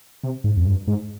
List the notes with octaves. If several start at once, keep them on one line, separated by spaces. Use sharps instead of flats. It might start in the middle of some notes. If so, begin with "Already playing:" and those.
C3
G#2
F2
G2
G#2